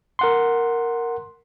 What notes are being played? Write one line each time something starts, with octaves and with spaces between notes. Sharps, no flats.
A#4 F#5 C6